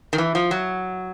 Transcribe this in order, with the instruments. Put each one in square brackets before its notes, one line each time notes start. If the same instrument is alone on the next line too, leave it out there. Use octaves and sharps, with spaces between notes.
[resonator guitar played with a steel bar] D#3
E3
F3
F#3